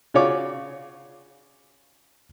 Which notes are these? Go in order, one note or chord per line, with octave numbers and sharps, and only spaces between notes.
C#3 F4 F#4 C#5 D5 D6